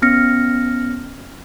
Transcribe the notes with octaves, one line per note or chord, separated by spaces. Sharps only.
B3 C#4 F6 A#6 C#7